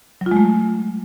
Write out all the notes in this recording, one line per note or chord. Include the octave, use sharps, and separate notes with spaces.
F#3
F4
G#3
A3